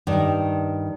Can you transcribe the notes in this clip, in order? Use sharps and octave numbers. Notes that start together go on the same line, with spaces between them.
G2 D#3